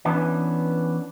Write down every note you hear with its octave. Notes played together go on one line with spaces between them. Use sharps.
E3 B3 C#4 D4